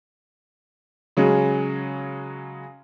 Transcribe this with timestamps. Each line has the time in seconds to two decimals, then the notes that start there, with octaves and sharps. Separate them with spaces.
1.17 C#3 F#3 G#3 C#4